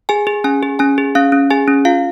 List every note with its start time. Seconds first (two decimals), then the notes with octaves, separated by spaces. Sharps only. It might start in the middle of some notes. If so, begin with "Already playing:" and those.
0.09 G#4 G#5
0.27 G#4
0.44 C#4 G#5
0.63 G#4
0.79 C#4 G#5
0.98 G#4
1.15 C#4 F5
1.32 C#4
1.50 G#4 G#5
1.68 C#4
1.85 F4 F5